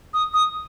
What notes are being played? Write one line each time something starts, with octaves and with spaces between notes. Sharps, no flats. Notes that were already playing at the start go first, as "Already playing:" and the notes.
D#6
D#6